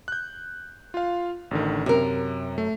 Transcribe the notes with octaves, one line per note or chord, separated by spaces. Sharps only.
F#6 G6
F4 F5
A1 D3 D#3
F#2 C3 A#4
A3